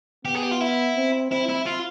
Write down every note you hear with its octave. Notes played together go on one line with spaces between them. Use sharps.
B3 G4
G#4
G4
F4
E4
C4
C4 E4
E4
F4